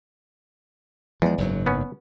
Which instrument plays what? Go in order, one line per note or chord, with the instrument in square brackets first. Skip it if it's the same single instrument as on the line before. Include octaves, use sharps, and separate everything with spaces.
[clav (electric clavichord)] E2 [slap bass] F3 G#3
[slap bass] F#1 G#2 F#3
[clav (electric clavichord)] B3 C#4